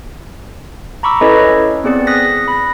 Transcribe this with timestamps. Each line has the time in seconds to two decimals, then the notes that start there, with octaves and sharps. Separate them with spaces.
1.03 A#5 B5 C#6 D6 E6
1.21 C#4 E4 A4 B4 C#5 D#5
1.84 B3 C4 G#4 D5 C#7
2.07 D#6 F#6 A#6 B6
2.48 B5 A#6